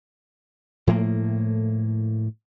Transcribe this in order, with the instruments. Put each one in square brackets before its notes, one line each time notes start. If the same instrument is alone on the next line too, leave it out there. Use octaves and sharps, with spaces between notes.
[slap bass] A2 F3 A3 A#3